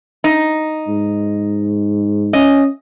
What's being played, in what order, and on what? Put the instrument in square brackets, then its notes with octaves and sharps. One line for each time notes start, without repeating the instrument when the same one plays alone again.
[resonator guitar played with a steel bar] D#4
[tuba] G#2
[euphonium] C#4 [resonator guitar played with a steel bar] D#5